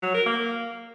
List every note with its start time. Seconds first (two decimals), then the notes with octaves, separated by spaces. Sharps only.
0.02 F#3
0.14 A#4
0.26 A#3